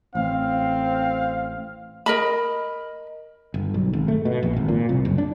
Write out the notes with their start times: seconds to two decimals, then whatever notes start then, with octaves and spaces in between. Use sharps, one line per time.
0.15 A1 C4 F5
2.06 A#4 D#5 B5
3.54 G1
3.74 B1
3.93 G#1
4.08 A3
4.25 B2
4.43 A#1
4.56 G#1
4.68 A#2
4.89 C2
5.05 F#1
5.18 D4